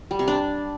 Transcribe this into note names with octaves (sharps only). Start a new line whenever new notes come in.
G3
C3
D4